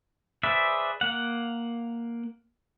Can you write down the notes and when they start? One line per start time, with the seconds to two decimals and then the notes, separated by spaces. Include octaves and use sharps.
0.43 G#4 B4 C5 D5 E5
1.01 A#3 F#5